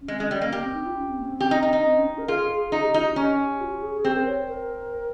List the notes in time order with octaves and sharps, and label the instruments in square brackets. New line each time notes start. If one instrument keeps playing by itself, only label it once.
[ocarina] C#4
[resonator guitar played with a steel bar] G#3 [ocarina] C4
[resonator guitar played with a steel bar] G#3 [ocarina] C#4
[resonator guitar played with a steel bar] G3 [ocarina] C#4
[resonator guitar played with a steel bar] A#3 [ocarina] C#4
[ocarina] A#3 [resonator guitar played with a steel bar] G4
[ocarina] C4
D#4
F4
C#4
C4
A#3
C#4
C4
[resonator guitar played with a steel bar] G4
D#4
D#4
[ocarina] C#4 [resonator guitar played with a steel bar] D#4
[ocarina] C4
C#4
C#4
A#4
[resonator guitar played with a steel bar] F4 [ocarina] G#4
[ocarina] G#4
[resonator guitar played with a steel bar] D#4 [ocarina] G#4
[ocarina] G4
[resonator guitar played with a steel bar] D#4 [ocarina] F4
[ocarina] G4
[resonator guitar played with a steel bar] C#4
[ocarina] F4
G4
G#4
G#4
[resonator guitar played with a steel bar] C4 [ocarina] G4
[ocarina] A#4
C#5
A#4